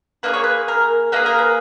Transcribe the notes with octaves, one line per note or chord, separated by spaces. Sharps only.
A#3 D#4 G#4 B4
C#5
B4
A#4
A#3 D#4 G#4 B4
A#4
B4